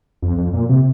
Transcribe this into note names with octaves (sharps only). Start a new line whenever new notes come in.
F2
F2
A#2
C3